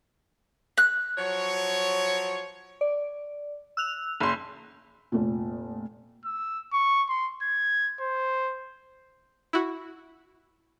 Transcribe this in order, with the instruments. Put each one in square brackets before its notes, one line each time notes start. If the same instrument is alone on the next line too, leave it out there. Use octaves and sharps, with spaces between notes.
[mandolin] F#6
[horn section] F3 F#3 C#5
[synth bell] D5
E6 F#6 F7
[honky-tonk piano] F#1 C6
[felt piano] F1 A#2
[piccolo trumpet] E6
C#6
C6
G#6
C5
[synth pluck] E4 F#4